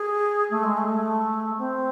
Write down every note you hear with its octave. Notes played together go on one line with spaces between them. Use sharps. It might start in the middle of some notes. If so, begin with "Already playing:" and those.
Already playing: G#4
A3
G#3
A3
C4